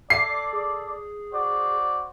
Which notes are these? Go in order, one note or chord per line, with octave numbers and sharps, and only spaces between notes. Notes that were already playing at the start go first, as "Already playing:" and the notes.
A4 D5 D6 C7
G#4
F#4 C5 D5